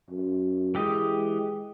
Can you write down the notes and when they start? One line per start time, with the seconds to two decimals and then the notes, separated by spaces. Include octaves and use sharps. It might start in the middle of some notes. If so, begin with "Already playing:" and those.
0.10 F#2
0.75 E3 G#3 G4 D#5